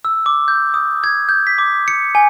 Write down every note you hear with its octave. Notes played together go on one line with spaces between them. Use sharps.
E6
D6
G6
D#6
G#6
G6
B6
D6
C#7
G#5